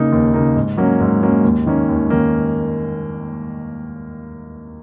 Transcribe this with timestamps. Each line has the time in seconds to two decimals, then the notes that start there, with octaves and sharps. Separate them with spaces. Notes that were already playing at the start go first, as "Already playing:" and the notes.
Already playing: C#3 A#3 D#4
0.12 D#2
0.34 C#3 A#3 D#4
0.56 G#2
0.77 F#3 A#3 C#4
1.00 G#2
1.22 F#3 A#3 C#4
1.44 D#2
1.66 D#3 A#3 C#4
1.88 D#2
2.10 D#3 A#3 C#4